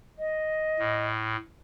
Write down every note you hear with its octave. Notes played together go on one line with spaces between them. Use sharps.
D#5
A2